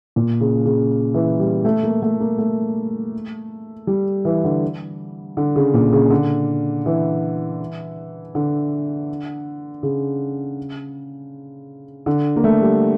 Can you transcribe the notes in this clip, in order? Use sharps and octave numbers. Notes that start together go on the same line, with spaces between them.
A#2
C#3
C#3
E3
G3
A3
A#3
A3
A#3
A3
G3
E3
D3
D3
C#3
A#2
C#3
D3
E3
D3
C#3
D3
A#3
A3
G3